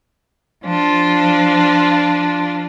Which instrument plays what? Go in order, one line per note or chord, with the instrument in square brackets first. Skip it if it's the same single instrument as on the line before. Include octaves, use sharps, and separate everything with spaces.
[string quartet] F3 D4 F4